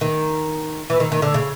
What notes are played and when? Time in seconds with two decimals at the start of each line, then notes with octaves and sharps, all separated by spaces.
0.01 D#3
0.90 E3
1.00 D#3
1.12 D#3
1.22 D3
1.34 C#3